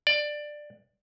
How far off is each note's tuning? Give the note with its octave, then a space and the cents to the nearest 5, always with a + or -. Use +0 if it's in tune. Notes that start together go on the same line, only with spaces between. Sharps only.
D5 +15